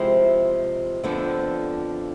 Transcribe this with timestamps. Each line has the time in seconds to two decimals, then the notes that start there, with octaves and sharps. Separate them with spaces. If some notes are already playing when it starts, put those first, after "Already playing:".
Already playing: C3 F3 G#3 C4 E4
1.03 F2 D3 F3 B3 D4